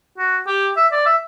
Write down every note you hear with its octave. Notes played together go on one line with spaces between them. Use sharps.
F#4
G4
E5
D5
E5